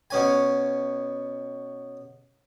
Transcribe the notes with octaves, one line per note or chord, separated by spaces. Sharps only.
B2 C#4 G#5